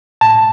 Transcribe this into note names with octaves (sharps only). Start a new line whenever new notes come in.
A2 A5